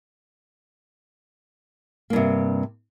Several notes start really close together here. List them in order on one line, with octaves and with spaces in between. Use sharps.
A#3 G2 C3